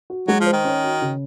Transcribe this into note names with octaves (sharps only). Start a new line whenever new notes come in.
F#4
F#3 G#3
F3
C5
D#3
C#4
F#4
C#3